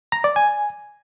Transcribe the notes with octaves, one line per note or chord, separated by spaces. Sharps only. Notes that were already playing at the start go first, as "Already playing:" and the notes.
A#5
D5
G#5